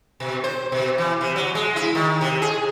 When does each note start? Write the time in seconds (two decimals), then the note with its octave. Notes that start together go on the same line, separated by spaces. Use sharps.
0.20 B2
0.44 C5
0.72 B2
0.98 E3
1.21 C3
1.36 F#3
1.55 G#3
1.76 E4
1.95 D#3
2.21 C3
2.42 G#4